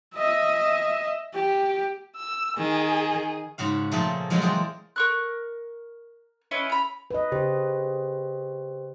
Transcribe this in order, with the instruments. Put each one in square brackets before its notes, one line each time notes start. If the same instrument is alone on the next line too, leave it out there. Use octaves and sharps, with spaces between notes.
[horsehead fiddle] D#5 E5
G4
[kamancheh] E6
[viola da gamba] D#3 [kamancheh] G#4
[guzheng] G#2 C#3 F#4 F5
A#2 F3 A3 A#3 G#4 A4
F3 F#3 G#3 A#3 C#4 A#4
E3 G#3 G#4 C5 D5 G5
[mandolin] A#4 C#6 F#6
C#4 E4 B4 D#5
A#5 B5
[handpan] B4 D#5
[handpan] C#3 [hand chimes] G4 C5